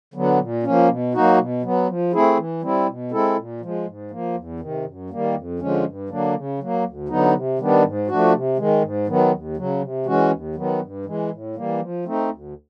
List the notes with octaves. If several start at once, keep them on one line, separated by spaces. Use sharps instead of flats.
D3 F#3 B3
A#2
F3 A#3 C#4
B2
F#3 A#3 D#4 F#4
B2
F#3 B3
F3
A3 C4 E4 G#4
E3
G3 C4 E4
B2
G#3 C4 E4 A4
A#2
F3 G#3
G#2
F3 A#3
E2
C3 D#3
F#2
D#3 G3 A#3
F2
D3 F3 G#3 C#4
G2
D3 F#3 A#3 D4
C#3
F#3 A#3
D2
D3 F#3 B3 D#4
C3
D#3 G3 B3 D4
G#2
F3 A3 D4 F#4
C3
D#3 G#3
G#2
D#3 F#3 B3
D#2
C#3 F#3
C3
E3 G#3 C#4 F#4
D#2
D#3 F#3 B3
G2
E3 G#3
A2
E3 G3 A#3
F3
A3 C4 D#4
D2